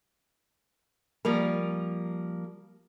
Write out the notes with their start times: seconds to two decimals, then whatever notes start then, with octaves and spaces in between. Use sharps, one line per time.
1.25 F3 G3 A#3 A#4